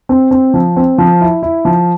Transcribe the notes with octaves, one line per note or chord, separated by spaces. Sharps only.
C4
C4
F3
C4
F3
E4
E4
F3